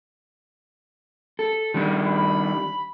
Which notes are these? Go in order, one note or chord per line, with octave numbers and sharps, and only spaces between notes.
A4
D#3 G3 D4
B5